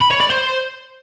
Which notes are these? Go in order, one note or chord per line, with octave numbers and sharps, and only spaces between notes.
B5
C#5
D5
C5